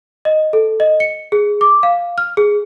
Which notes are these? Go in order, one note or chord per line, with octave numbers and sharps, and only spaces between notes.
D#5
A4
D#5
C#7
G#4
D6
F5
F6
G#4